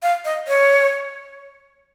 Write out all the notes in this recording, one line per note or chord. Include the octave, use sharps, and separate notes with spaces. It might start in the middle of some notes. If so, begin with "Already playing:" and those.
F5
D#5
C#5